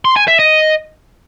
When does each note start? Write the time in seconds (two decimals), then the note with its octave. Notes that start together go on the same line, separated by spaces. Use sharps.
0.05 C6
0.16 G#5
0.28 E5
0.39 D#5